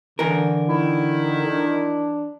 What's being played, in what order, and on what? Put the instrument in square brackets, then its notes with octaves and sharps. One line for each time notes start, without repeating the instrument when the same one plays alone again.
[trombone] D3 [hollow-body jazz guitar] E3 A#4
[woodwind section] D#3 E4
[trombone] D4